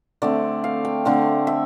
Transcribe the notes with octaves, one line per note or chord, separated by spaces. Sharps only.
D3 A3 C4 D5
F5
G5
D3 A3 C4 F5
E5